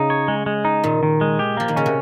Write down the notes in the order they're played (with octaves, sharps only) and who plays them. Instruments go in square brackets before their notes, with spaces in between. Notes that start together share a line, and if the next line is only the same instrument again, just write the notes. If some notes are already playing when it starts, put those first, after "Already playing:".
Already playing: [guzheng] C#3 [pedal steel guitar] D#4
[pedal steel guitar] C#5
G#3
G#3
D#4
[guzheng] A#2 [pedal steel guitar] D#3
[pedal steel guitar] D#3
G#3
G4
[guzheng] F3 [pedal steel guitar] A#3
[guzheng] D#3
[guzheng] C#3 [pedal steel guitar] C#4
[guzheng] C3